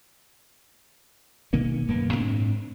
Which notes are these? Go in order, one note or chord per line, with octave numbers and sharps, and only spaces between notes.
B2 D#3 A#3 C#4
D1 F#2 A#3 B3
G#2 C4 D4